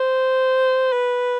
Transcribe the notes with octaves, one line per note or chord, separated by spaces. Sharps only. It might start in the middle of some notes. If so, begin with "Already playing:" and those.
Already playing: C5
B4